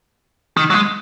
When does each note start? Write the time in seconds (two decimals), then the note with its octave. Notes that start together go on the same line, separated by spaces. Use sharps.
0.57 D#3
0.70 F#3
0.74 G#3